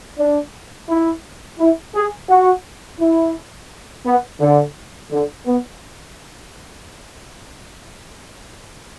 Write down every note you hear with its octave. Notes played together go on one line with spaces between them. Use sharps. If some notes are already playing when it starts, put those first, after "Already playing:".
D4
E4
E4
G#4
F#4
E4
B3
D3
D3
B3